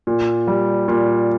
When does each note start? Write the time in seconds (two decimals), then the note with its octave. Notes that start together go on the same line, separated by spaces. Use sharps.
0.07 A#2
0.47 G3
0.88 A#2